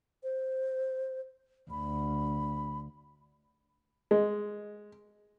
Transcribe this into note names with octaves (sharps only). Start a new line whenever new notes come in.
C5
D2 B5
G#3